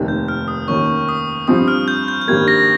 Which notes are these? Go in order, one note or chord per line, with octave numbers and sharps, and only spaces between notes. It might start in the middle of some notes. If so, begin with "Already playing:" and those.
Already playing: F1 D#2 D#3
G6
F6
D#6
D#2 D#3 A#3 C#4 C#6
D#6
G2 F3 C4 D#6
F6
G6
G6
G6
G#1 G2 G3 A#3 G#6
A#6